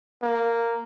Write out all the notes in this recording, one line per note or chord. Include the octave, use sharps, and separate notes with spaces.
A#3